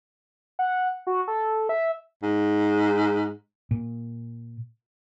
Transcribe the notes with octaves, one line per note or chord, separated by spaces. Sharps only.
F#5
F#4
A4
E5
G#2
A#2